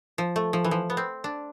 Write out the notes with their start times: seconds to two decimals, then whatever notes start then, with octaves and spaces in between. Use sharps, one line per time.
0.18 F3
0.36 A3
0.53 F3
0.64 E3
0.71 F3
0.90 B3
0.97 C4
1.24 D4